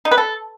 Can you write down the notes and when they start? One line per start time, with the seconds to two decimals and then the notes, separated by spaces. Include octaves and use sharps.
0.05 D#4
0.11 B4
0.18 A4